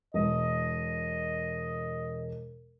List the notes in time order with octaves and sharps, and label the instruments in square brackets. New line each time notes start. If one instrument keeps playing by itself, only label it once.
[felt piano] E1 [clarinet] D#5